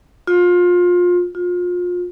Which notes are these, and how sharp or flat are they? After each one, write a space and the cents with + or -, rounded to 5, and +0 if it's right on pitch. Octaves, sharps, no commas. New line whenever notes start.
F4 +25
F4 +30